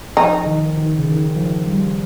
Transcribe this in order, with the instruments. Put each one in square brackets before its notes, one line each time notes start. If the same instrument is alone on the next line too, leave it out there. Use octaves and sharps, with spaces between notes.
[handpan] F3 [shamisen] D#4
[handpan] D#3
D#3
C#3
D#3
F3
G3